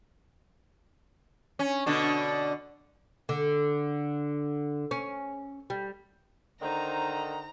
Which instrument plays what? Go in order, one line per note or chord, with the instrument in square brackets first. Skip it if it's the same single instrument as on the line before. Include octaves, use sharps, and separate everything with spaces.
[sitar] C#4
B2 D3 D4
[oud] D3
C#4
G3
[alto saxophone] D3 [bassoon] D#3 [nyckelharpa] D#4 C5 [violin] A#5